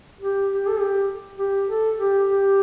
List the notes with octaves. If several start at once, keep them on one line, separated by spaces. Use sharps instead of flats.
G4
G4
A4
G4
G4
A4
G4
G4